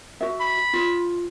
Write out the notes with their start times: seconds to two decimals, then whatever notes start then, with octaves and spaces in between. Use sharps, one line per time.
0.21 F#4 E5
0.40 B5
0.73 F4